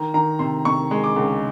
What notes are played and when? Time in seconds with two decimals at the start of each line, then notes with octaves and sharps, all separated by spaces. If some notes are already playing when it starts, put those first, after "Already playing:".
Already playing: D#3 A#5
0.14 D#3 A#5
0.39 C3 C6
0.65 C3 C#6
0.91 G#3
1.04 D6
1.16 C#2